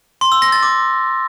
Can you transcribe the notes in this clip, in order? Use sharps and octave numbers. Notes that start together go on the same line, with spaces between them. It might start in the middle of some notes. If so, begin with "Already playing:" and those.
C6
E6
A#6
A6
D6